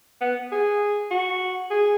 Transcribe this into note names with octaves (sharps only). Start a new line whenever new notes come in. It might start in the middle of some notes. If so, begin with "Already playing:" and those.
B3
G#4
F#4
G#4